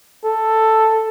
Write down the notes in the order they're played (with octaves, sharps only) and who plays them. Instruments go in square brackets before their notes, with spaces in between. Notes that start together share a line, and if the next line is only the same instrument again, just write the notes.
[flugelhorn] A4